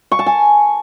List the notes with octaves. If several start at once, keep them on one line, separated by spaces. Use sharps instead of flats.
C#6
A5
G#5